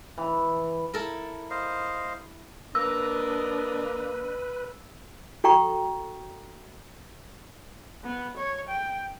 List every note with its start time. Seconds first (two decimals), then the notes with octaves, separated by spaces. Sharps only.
0.18 E3
0.94 E4 A4 A#4
1.50 C5 D#5 F5
2.75 A#3 D4 B4 D#5 E6
5.44 F#4 A4 G5 A#5 C#6
8.04 B3
8.37 C#5
8.69 G5